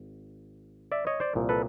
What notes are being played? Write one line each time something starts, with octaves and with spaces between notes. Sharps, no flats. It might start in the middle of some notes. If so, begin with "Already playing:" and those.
Already playing: G#1
D5 E5
C#5 D#5
C5 D5
C2 A#2 F3
A4 B4